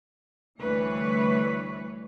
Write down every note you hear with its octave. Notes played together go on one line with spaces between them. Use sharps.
D2 E3 G3 B4 C#5